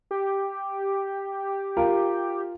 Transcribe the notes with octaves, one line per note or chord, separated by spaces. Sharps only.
G4
F4 A#4